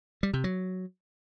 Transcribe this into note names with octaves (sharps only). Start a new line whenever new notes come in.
G3
C3
F#3